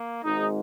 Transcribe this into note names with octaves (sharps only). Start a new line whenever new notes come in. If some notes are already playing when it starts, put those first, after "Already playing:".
Already playing: A#3
G#1 G#2 G#3 D#4